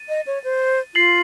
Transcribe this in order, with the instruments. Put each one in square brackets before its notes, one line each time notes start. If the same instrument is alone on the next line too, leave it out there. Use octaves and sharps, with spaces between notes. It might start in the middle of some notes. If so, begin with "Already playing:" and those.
Already playing: [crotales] A6 D#7
[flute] D#5
C#5
C5
[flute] F4 [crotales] A6 C7 F#7